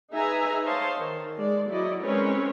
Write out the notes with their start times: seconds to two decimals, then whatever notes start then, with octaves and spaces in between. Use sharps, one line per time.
0.13 D#4 G#4 B4 E5 G#5 A#5
0.63 C5 C#5 D#5 F5 A5 C6
0.97 D#3
1.37 G#3 D5
1.68 F#3 E4 D5 D#5
2.02 G#3 C4 C#4 A#4 B4 C#5